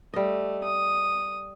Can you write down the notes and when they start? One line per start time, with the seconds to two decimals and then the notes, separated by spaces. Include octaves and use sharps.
0.14 G3 A3 D#5
0.64 D#6